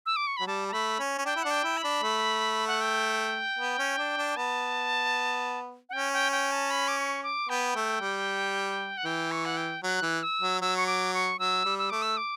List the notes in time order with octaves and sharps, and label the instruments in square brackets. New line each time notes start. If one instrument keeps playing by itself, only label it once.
[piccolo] E6
D6
C#6
[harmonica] F#3 [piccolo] B5
[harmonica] G3 [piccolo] A5
[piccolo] A5
[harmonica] A3 [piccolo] B5
[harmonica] C#4
C#4
[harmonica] D4 [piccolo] G5
[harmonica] E4
[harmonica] D4 [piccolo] F#5
[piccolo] G5
[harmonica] E4
[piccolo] B5
[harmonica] D4
A3
[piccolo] F#5
G5
[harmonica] B3
C#4
D4
D4
[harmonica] B3 [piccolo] A5
[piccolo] F#5
[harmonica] C#4 [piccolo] G5
[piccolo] G5
G5
A5
B5
D6
C#6
D6
[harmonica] B3 [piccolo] G5
[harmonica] A3
G3
[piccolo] F#5
[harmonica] E3 [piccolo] G5
[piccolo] C#6
F#5
G5
[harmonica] F#3 [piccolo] F#6
[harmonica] E3
[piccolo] E6
[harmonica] F#3
[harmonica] F#3 [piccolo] E6
[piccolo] C#6
D6
C#6
[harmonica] F#3 [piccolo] E6
[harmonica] G3
[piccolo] E6
[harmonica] A3 [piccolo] D6
[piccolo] E6
D6